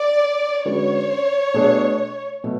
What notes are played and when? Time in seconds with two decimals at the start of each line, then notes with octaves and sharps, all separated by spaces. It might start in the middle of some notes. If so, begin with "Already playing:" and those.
Already playing: D5
0.65 D3 G#3 C#4 F#4 B4 C#5
1.54 B2 A3 D4 G#4
2.44 B2 A3